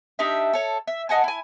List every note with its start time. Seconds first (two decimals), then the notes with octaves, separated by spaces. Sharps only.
0.19 D4 D#4 G4 E5
0.53 A4 C#5
0.87 E5
1.09 D#5 F#5 G#5 A5
1.24 E4 G#5